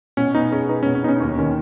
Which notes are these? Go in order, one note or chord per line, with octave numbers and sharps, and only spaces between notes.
B2 C#4
B3 D#4
C#4 G#4
D#4 B4
B2 C#4
C#4
B3 D#4
C#4
D#4
D#2 C#4
D#3 C#4